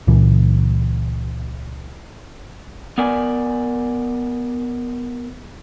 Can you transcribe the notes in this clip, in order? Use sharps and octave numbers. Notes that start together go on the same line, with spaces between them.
C#2 A#2 E3
B3 A#4 D5 G#5